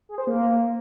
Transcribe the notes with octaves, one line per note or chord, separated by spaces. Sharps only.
G#4
C5
A#3